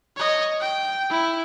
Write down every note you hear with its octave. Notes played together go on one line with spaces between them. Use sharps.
C#5 D#5
G5
E4